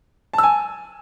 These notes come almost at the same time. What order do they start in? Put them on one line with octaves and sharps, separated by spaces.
A5 E6 G#5